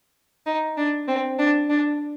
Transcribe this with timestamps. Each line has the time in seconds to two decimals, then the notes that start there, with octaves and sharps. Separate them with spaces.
0.46 D#4
0.77 D4
1.08 C4
1.39 D4
1.70 D4